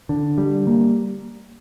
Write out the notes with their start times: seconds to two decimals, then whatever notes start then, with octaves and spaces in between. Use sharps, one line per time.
0.09 D3
0.38 G3
0.67 A#3